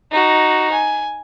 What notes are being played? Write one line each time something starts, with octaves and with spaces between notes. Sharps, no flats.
D#4 F#4
G#5